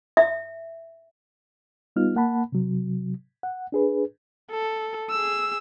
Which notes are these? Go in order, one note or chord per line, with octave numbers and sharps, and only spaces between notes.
E5
G3 B3 D#4 F4 F6
A#3 F#5 A5 B5
C3 F#3
F#5
D4 G#4 B4
A4
G#4 E6